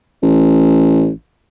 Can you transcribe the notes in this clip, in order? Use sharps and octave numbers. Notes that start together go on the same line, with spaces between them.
A1